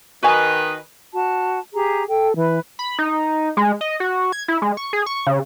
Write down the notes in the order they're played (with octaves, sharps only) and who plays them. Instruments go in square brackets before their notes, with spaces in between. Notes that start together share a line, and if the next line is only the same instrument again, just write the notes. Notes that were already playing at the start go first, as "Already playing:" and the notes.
[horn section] D#3 B4 D#5 [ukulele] F#4 G#5
[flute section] F#4 A5
G4 G#4 A#5
[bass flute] A4 [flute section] G5
[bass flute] E3 [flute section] B4
[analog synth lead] B5
D#4
G#3
D#5
F#4
G#6
E4
G#3
C#6
G#4
C#6
C#3